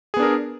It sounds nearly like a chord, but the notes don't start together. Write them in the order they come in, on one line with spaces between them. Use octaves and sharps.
G#4 B3 D4 A#4